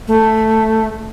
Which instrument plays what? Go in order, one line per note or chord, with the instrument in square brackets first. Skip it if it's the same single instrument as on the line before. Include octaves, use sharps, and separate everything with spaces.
[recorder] A3